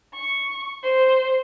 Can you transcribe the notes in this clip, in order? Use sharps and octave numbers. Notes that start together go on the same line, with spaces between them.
C#6
C5